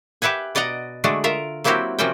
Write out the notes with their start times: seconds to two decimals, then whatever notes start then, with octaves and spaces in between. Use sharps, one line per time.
0.22 G4 B4 E5 F#5 G#5
0.55 B2 D5 D#5 F#5 A#5
1.04 D3 G#3 A3 D4 F#4
1.24 F4 A#4 E5
1.64 F#3 A#3 C4 E4 F#4 G4
1.99 C3 F3 A#3 C#4 F#4 G5